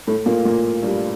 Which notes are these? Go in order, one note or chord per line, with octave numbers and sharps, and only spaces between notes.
A2 A3
A#2 A#3
A#2 A#3
G2 G3